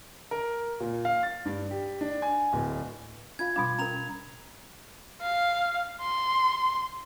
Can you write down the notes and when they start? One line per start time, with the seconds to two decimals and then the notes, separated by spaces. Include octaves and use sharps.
0.31 A#4
0.80 A#2
1.05 F5
1.23 A6
1.46 G2
1.71 G4
2.01 D4
2.22 G#5
2.53 D1
3.39 D4 F4 F5 G#6
3.56 B2 G3 D4 F5 B5 C6
3.79 C#4 A#4 A#5 F7
5.22 F5
6.01 C6